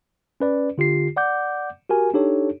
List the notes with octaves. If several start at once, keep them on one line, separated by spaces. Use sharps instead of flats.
C#4 B4 D5
D3 F4 G4 C7
D5 F#5 D6 G6
F#4 G4 A#4 G#5
D4 D#4 G4 A4 C#5